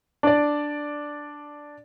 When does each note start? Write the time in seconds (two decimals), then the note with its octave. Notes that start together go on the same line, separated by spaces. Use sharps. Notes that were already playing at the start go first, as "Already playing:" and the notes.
0.23 D4 D5